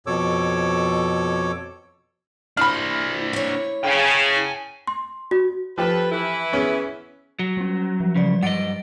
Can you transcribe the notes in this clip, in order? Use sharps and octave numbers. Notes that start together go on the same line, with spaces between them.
F2 B2 A4 C#5 D6 E6
D4 E4 C5 B5 F6
E4 C#5
C#3 G5 G#5
C6
F#4
F3 G4 A4 B4 C5
E3 E4 B4
B3 C#4 G#4
F#3
G3 C#4
F3
C#3 F#3 G3 D5
G2 D#5 F#5 A6 D7